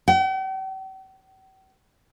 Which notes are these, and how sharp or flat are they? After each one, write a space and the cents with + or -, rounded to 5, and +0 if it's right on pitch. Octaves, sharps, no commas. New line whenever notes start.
G5 -45